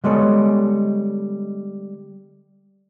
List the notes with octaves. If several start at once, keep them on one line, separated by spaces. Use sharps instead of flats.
D3 G3 G#3 B3 A4 C#5